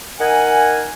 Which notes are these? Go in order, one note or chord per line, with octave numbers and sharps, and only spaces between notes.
D#4 A#4 F#5 G#5